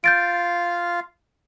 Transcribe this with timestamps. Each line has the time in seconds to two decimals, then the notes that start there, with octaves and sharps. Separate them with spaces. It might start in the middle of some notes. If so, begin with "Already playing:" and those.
0.04 F4 F5 G6 A6 D7